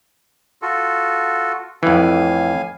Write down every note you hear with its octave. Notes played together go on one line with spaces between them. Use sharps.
F4 F#4 A4
F2 A2 E3 F5 G#5